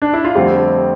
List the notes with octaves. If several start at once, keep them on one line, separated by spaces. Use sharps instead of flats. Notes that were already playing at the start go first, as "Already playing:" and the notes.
D4
E4
F4
F2 D3 G3 A3 C4 G4